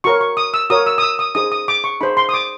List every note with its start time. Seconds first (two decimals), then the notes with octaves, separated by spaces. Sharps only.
0.04 F#4 A#4 C#5 C#6
0.21 C#6
0.37 D#6
0.54 E6
0.70 F#4 A#4 C#5 D#6
0.86 E6
0.98 D#6
1.02 E6
1.19 D#6
1.35 D#4 G#4 C5 D#6
1.52 D#6
1.68 D6
1.84 C#6
2.01 D#4 G#4 C5 B5
2.17 C6
2.29 D#6
2.34 D6